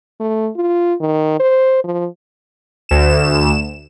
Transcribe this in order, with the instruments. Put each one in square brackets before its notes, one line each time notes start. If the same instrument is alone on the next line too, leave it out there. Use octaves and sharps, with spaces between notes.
[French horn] A3
F4
D#3
C5
F3
[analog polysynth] D2 E7